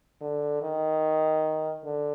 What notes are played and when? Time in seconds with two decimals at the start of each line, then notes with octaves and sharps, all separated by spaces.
0.21 D3
0.62 D#3
1.85 D3